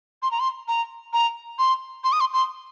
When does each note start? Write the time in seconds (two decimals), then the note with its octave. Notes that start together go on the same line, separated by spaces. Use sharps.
0.22 C6
0.31 A#5
0.40 C6
0.68 A#5
1.13 A#5
1.59 C6
2.04 C6
2.12 D#6
2.20 C6
2.33 C6